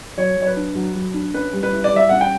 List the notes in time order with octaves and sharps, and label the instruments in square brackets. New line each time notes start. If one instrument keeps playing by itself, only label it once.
[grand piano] F#3 [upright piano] C#5
[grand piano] F#3
[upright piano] C#5
B4
[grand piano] D4
F#3
F#3
D4
[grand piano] C#4 [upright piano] B4
[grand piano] G3
[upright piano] B4
[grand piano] E4
[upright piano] D5
[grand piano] G3 [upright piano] E5
[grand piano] C#4 [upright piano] F#5
[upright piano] G5